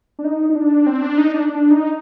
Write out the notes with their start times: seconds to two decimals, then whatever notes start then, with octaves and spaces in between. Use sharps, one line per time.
0.19 D4
0.24 D#4
0.50 D#4
0.55 D4
0.86 C4
1.02 D4
1.18 D#4
1.34 D4
1.49 D4
1.71 D#4